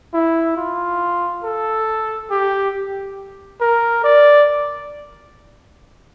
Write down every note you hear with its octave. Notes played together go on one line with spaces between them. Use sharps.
E4
F4
A4
G4
A#4
D5